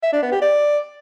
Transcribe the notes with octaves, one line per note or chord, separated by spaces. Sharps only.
E5
D4
B3
G4
D5